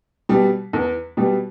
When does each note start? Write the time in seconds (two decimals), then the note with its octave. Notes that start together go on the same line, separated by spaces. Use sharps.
0.29 B2 G3
0.73 E2
1.17 B2 G3